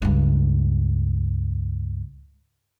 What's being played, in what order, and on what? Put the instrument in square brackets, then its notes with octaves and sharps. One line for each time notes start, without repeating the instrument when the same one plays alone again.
[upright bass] C#2 G2